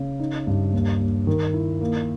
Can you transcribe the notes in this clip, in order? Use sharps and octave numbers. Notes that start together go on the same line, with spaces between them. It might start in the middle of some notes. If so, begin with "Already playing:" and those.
Already playing: C#3
D#4
G2
D#2
D#2
D#3
E4
A#3